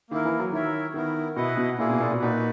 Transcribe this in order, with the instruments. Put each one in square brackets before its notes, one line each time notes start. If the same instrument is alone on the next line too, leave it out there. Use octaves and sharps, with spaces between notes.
[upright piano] D#3 [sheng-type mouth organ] A#3 E4 A#4
[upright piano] E3
F#3
[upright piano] D#3 [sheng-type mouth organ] E4 A#4 C#5 E5
[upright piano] D#3 [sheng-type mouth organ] B3 E4 A#4
[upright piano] B2 [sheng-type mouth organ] E4 B4 D#5 F#5
[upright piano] B2
[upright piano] A#2 [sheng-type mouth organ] A#3 E4 G#4
[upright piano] B2
A#2
B2
[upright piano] A#2 [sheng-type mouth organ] D#4 F#4 B4